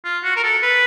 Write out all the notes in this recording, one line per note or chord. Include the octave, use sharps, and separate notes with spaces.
F4
F#4
A#4
A4
B4